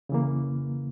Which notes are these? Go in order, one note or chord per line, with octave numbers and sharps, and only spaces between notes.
C#3 E3 A#3